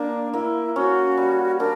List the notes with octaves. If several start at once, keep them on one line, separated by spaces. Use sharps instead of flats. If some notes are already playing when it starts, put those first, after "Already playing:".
Already playing: A#3 D4
A#3 E4
C#4 F#4
G3
D4 A#4